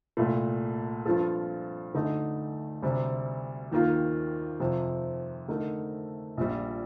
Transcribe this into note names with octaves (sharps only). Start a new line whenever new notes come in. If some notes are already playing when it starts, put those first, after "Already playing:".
C2 A#2 A3
G2 F3 C4 F4 A4
D2 D3 A3 D#4
D2 C3 G3
D#2 D#3 A#3 F4 A#4
F2 C3 F3
D3 A3 D#4 A#4
A#1 A#2 G3